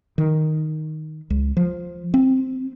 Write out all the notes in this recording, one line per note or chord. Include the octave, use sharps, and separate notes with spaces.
D#3
C#2
F3
C4